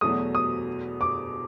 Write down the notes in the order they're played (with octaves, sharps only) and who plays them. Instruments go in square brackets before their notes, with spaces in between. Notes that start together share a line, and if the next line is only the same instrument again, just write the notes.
[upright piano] E2 B2 F#3 A3 [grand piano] D#6
[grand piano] D#6
D6